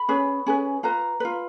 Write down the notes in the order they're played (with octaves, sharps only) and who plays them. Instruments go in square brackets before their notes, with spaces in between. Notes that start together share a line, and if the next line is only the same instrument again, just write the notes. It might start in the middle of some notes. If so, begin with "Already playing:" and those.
Already playing: [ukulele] B5
C#4 G#4 B4
C#4 G#4 B4
F4 B4 A#5
F4 B4